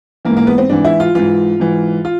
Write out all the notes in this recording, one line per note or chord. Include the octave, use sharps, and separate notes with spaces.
G#2 E3 A#3
A#3
B3
C4
G#2 E3 D4
E4
F4
G#2 E3 F4
G#2 E3
F4